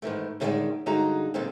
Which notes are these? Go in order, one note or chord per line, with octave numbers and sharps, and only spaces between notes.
G#2 D#3 E3 A3
A2 D3 D#3 F3 G3 G#3
G2 D3 G#3 D#4 F#4 A#5
A#2 D3 G3 G#3 B3 C4